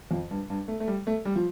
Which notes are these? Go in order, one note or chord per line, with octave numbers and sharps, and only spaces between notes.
F2
G2
G2
A3
A3
G3
A3
G3
F3